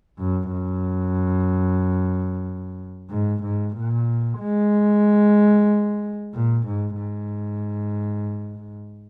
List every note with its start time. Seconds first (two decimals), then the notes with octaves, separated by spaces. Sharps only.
0.19 F#2
0.52 F#2
3.10 G#2
3.43 G#2
3.75 A#2
4.40 G#3
6.34 A#2
6.66 G#2
6.99 G#2